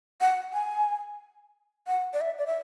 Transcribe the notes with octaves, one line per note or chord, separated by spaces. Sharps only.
F#5
G#5
F#5
D5
E5
D5
E5